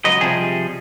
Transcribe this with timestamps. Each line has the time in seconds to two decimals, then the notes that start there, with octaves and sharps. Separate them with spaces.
0.05 C#2 F#3 B4 D#5
0.21 C3 F3 G3 G#4